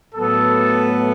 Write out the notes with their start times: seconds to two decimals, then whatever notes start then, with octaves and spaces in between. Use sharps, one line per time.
0.15 A2 F#3 B3 A4